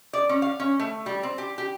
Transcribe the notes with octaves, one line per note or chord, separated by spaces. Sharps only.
D5
C#4
F5
C#4
A3
G3
C4
G4
G4